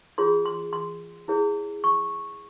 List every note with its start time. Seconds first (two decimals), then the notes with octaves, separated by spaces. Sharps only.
0.18 F4 G#4 C#5 C6
0.45 C6
0.73 C6
1.28 E4 G#4 C#5
1.84 C#6